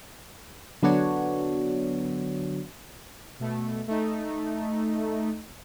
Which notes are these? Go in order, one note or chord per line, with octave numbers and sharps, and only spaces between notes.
D3 F#3 B3 D4 F#4 C#5
B2 A3
A3 D#4